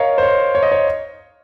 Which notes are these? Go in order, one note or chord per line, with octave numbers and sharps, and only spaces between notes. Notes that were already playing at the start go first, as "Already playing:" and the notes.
Already playing: A#4 C#5 D#5 F5
C5
C#5
C#5
D#5
C#5